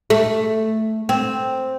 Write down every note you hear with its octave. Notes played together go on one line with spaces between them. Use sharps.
A3
C4